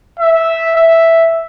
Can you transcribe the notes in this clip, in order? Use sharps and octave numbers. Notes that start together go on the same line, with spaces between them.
E5
E5